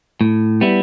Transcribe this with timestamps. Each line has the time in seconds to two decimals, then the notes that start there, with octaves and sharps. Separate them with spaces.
0.21 A2
0.61 G3 B3 E4